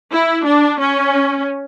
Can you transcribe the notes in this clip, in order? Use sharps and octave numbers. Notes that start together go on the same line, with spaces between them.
E4
D4
C#4